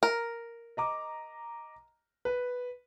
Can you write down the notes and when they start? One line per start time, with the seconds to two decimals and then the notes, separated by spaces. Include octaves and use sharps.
0.03 A#4
0.77 D#5 A#5 D6
2.25 B4